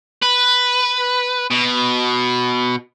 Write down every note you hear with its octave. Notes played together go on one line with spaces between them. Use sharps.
B4
B2